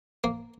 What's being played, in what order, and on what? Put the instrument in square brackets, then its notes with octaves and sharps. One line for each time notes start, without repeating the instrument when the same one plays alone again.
[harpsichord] A#3